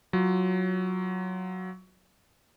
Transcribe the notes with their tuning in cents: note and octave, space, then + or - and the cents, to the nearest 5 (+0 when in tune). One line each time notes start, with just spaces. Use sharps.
F#3 +0 F4 +0